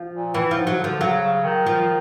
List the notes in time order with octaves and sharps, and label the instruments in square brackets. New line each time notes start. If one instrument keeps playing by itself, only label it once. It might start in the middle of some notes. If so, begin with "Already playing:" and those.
Already playing: [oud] F3
[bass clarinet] A#2
[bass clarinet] A2 [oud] E3
[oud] F3
[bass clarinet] G#2
[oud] F#3
[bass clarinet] D3
[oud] F3
[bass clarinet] C#3 [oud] F#3
[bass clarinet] C#3
D#3
[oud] F3